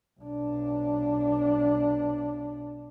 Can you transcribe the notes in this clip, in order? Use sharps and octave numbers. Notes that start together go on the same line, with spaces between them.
B1 D4